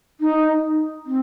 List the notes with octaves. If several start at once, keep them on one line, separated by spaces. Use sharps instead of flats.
D#4
C4